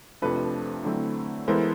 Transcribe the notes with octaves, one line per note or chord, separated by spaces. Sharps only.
F2 C3 F3 A3 D4 A4 B4
D3 F#3 A3 C4 E4
E3 G#3 B3 E4 A4 A#4 C5